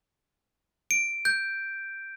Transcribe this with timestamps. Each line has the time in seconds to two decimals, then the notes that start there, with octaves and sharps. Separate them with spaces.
0.91 D7
1.25 G6